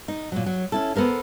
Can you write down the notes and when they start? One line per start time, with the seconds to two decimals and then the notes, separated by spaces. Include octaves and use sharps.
0.08 D#4
0.32 A#2 F#3
0.46 F#3
0.72 C#4 E4 A4
0.95 B3 A4 A#4 C5